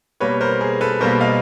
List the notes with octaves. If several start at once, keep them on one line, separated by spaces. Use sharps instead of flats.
B2 G3 A#3 B4 C#5
A#4 C5
G#4 A#4
A4 B4
B2 G3 A#3 A#4 C5
D#5 F5